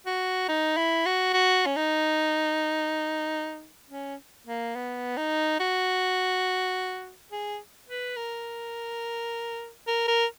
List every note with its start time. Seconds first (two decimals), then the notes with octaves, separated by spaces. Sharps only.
0.06 F#4
0.49 D#4
0.77 E4
1.06 F#4
1.34 F#4
1.66 C#4
1.77 D#4
3.90 C#4
4.47 A#3
4.76 B3
5.17 D#4
5.60 F#4
7.32 G#4
7.89 B4
8.17 A#4
9.87 A#4
10.08 A#4